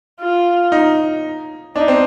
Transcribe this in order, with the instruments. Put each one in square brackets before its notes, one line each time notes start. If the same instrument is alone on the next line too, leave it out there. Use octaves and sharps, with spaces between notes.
[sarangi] F4
[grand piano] D#4
[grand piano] D4 [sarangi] D#4
[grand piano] C4